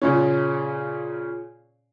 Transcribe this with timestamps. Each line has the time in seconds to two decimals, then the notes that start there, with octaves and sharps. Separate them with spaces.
0.02 A#2 C#3 C#4